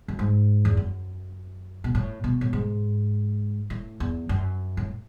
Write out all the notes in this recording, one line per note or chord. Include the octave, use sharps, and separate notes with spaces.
F#2
G#2
E2
F#2
B2
A2
B2
A2
G#2
A2
E2
F#2
A2